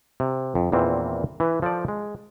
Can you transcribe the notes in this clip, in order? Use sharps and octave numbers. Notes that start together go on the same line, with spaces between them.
C3
F2
E2 A#2 D#3 E3 C4
E3 B4
F3 A4 C5 D5
G#3